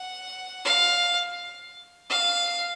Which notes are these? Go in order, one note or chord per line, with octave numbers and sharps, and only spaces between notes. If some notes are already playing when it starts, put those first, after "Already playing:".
Already playing: F#5
F5
F5